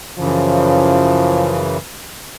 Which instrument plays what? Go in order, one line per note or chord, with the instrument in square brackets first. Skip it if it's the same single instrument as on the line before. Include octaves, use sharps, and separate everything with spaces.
[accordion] F#2 C#3 E3 [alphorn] F3